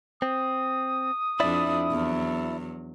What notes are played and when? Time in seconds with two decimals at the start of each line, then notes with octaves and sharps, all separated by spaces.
0.22 C4 D#6
1.40 F2 D4 E4 D5 E5
1.91 E2 F#3